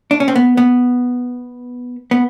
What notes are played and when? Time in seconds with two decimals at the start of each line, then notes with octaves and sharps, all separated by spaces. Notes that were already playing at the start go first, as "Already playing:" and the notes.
0.11 D4
0.20 C#4
0.28 C4
0.36 B3
0.57 B3
2.11 B3